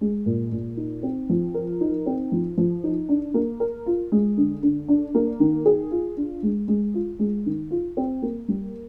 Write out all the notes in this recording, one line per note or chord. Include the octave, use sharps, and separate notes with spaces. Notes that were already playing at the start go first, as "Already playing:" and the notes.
G#3
A#2
A#2
D#4
C4
F3
A#4
D#4
C4
F3
F3
D#4
D4
A#3
A#4
F4
G#3
D3
D3
D4
A#3
D#3
G#4
F4
D4
G#3
G#3
F4
G#3
D#3
F4
C4
A#3
G3